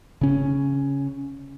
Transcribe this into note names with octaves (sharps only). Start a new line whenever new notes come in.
C#3 C#4